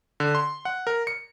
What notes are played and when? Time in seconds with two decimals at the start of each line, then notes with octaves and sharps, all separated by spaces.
0.20 D3
0.35 C6
0.65 F#5
0.87 A#4
1.07 C#7